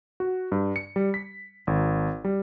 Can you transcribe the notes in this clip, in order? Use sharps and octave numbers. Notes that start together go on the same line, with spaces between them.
F#4
G2
C#7
G3
B6
G#1
G3